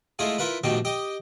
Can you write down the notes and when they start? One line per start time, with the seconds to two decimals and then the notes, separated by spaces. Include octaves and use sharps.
0.19 G#3 A3 E4 F4 G#4
0.38 E4 F4 A#4 B4
0.64 A#1 B2 D#3 A3 G4
0.85 G4 D#5